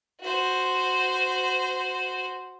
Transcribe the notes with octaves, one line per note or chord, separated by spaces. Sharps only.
F#4 C5